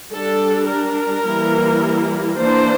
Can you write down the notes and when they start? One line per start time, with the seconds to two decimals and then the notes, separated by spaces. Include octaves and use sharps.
0.12 G3 D4 A4
0.69 A#4
1.26 E3 G3 A#3 E4
2.40 E3 A#3 D4 C5